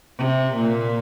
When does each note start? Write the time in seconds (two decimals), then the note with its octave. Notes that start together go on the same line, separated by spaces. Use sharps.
0.17 C3
0.54 A#2